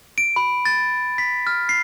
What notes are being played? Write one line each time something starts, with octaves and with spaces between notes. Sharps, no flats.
D7
B5
A6
B6
F6
C7